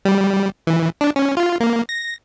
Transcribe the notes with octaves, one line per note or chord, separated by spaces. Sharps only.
G3
E3
D4
C#4
F4
A#3
A#6